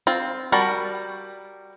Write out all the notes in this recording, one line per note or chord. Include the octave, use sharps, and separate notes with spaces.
C4 F4
G3 F#4 A#4 A5 B5